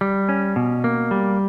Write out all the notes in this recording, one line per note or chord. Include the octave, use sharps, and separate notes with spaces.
G3
C#4
B2
A#3
G3